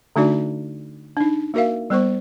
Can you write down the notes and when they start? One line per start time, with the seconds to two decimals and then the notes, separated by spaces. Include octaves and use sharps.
0.16 D3 A3 D4 D#4 F#4 D5
1.17 D4 D#4
1.54 A#3 F#4 A#4 E5 F5
1.90 G3 B3 C5 C#6